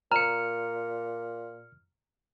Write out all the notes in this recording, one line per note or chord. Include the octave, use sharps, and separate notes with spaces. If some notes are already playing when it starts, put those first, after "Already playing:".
A#2 A#5 F6 C#7